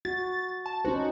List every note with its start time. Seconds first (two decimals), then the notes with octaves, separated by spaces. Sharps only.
0.05 F#4 A6
0.66 A5
0.85 C#4 D#4 F#4 C5